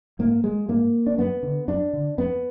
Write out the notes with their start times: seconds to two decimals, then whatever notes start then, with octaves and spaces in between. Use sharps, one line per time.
0.19 G#2 A#3
0.44 G#3
0.69 G#2 A#3
1.07 D4
1.18 F#2 B3
1.43 D3
1.68 F#2 D4
1.93 D3
2.18 F2 B3